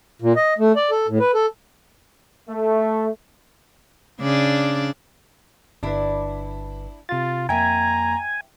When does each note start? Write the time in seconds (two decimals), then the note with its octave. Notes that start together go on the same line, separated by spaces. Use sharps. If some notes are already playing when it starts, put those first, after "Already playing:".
0.22 A#2
0.36 D#5
0.58 A3
0.76 D5
0.91 A4
1.08 A2
1.20 B4
1.34 A4
2.49 A3
4.20 C#3 D4 D5
5.83 G1 D4 E4 B4
7.09 C3 F4 A6
7.49 F2 A#3 E5 G5 G#5 A#5